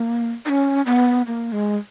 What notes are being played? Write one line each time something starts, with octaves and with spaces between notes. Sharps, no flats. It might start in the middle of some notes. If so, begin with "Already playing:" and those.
Already playing: A#3
D#4
C#4
B3
A#3
G#3